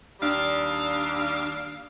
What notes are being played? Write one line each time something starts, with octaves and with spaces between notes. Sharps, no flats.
D#2 G3 D4 F5